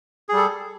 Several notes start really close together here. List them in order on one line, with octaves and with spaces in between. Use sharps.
G#4 G3 A4